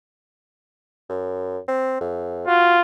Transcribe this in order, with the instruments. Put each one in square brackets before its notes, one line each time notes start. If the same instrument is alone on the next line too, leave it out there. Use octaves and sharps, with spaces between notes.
[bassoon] F#2
C4
F2
[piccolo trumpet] F4 [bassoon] F#4